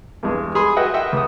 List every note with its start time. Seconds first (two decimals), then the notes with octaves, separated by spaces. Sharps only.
0.23 E2 G2 G#3
0.55 G#4 B5 C6
0.77 F#4 B4 D#5 E5 F#5 G5
0.94 A#4 D#5 E5 F#5 G5
1.13 C#2 D#6